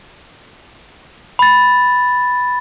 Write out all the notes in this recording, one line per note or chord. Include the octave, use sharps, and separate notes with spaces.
B5 A6